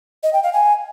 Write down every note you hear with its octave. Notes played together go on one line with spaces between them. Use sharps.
D#5
G5
F5
G#5